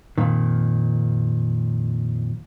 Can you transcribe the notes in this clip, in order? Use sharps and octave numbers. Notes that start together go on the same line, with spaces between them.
F2 A#2 D#3